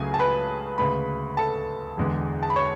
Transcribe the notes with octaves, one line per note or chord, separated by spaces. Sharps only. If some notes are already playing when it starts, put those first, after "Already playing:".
Already playing: C#2 C#3 F#3 A3 G#4 G#5
A5
B4 B5
D2 C#3 G#3 B4 B5
A4 A5
E1 E2 D3 G#3
A5
B5
C#5 C#6